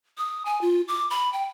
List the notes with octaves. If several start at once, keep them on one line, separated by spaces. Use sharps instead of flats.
D#6
G#5
F4
D6
B5
G5